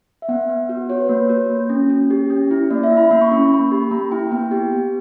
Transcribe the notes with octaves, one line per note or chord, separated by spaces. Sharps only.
E5
B3 F#5
B3
F#4 F#5
F#4 C#5
B4
A#3 C#5
F#4
A#3
C#4
C#4
G4
C#4
E4
A#3 D5
E5
E4
B5
A#3 B5
C#6
C#4 B5
C#6
A#3 B5
G4
A#3 A#5
E4 G5
B3 G5
G4
B3